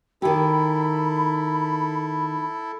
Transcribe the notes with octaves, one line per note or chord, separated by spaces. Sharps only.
D#3 E4 G4 A4 B5